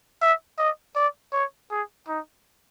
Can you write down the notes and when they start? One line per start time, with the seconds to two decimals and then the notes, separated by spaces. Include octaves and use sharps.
0.21 E5
0.58 D#5
0.96 D5
1.33 C#5
1.71 G#4
2.08 D#4